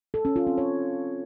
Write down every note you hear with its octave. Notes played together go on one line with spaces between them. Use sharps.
A4
C#4
F4
C4
C#5